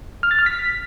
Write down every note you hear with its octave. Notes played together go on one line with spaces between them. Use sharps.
F6
A6
F6
B6